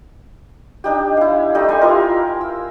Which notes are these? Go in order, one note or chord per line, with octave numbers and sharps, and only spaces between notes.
D4 D#4 G4
E4 F5
G3 A3 D#4
G3 G#5 C6
E4 F4 A#4
E6